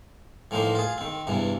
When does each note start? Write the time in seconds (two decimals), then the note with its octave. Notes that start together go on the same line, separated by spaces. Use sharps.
0.51 A2 E3 F3 A#3 D#4 C5
0.75 F4 G#4
0.98 D#3 C4
1.27 E2 G2 C3 E3